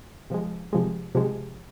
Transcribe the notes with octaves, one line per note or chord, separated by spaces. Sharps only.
C3 F3 G#3
C3 F3 G#3
C3 F3 G#3